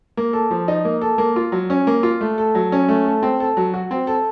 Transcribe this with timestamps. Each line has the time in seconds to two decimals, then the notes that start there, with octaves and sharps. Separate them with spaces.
0.17 A#3
0.33 A4
0.51 F3
0.68 D#4
0.85 A#3
1.01 A4
1.18 A#3
1.36 F4
1.52 F#3
1.70 C#4
1.87 A#3
2.03 F4
2.21 A3
2.38 A4
2.55 F#3
2.72 C#4
2.88 A3
3.06 A4
3.23 C4
3.40 A4
3.57 F#3
3.74 F#4
3.91 C4
4.07 A4